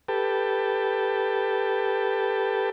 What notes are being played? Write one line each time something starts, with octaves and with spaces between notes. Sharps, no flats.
G4 A4 B4 G5 A5